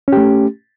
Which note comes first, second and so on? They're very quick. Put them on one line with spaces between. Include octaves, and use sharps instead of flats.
C#4 G4 A3